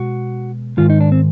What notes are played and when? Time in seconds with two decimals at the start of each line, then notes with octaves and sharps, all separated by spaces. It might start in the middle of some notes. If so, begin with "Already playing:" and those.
Already playing: B2 G#3 F#4
0.77 G#2 D#3 G#3 F4
0.90 D#4
1.01 D4
1.12 C4